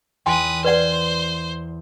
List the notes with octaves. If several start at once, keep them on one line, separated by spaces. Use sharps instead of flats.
E2 B4 G5 G#5 C6 D#6
B4 C5 D5 F#5 C6